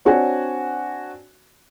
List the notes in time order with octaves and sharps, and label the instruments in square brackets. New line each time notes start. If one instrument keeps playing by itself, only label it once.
[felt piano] C4 D4 F#4 C#5 D5 G#5